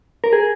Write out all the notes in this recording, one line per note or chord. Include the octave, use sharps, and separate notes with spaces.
A#4
G#4